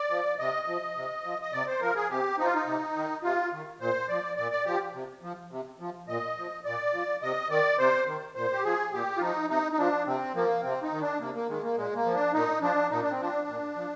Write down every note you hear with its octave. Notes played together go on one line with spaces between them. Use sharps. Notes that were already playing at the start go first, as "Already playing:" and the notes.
Already playing: D5
F3
C3 D#5
F3
C3
F3
D#5
C3 D5
C5
F3 A#4
G#4
C3 G4
F3 D#4
F4
D#4
C3
D#3
C3 F4
D#3
A#2 C5
F3 D5
A#2 D5
D5
F3 G4
C3
F3
C3
F3
A#2 D#5
F3
A#2 D5
F3
C3 D#5
D#3 D5
C3 C5
D#3
A#2 C5
G4
F3 G#4
A#2 G4
F4
F3 D#4
C3 D#4
D#4
F3 D4
C3 C4
F3 A#3
C3 C4
D#4
D#3
D4
C3 A#3
A#3
D#3 G#3
A#3
A#2 G#3
A#3
F3
D4
A#2 D#4
F3 D4
A#2 D#4
D4
C4
F3 D4
A#2
F3